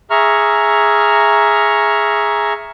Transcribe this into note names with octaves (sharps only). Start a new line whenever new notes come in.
G#4 E5 A#5 C#6 F6